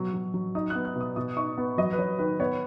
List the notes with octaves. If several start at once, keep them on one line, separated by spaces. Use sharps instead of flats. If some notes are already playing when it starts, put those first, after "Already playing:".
Already playing: B2 F#3
F#3
F#3
D#4 D#6
B3 F#6
F#6
B2
D#6
B2 D#6
D#4 C#6
B3
F#3 D#5
B4
F#3 C#5
D#3 B4
B3 C#5